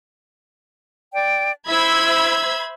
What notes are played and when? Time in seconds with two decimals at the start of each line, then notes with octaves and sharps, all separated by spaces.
1.13 D5 G5
1.67 E4 C5 E5 B5 E6 G#6